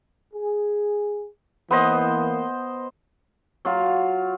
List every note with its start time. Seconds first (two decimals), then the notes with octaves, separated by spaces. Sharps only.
0.34 G#4
1.71 E3 A#3 B3 C5 D#5
3.65 F#3 F4 F5